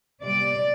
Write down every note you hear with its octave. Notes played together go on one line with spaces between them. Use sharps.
C3 G3 D5